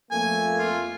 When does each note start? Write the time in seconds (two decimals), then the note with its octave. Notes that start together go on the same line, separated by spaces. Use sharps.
0.11 F2 A3 A#3 G#5
0.58 F4